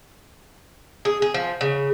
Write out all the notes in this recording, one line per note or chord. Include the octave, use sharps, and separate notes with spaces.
G#4
G#4
F3
C#3